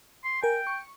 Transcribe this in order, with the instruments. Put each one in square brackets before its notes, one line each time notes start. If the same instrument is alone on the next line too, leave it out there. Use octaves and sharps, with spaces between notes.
[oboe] C6
[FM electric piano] A#4 G#5 [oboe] G5
[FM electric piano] C#6